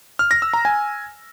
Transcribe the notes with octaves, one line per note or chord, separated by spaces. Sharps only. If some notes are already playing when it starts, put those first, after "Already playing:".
F6
A#6
E6
A#5
G#5